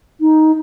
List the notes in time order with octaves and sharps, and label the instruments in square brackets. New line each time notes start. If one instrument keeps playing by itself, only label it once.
[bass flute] D#4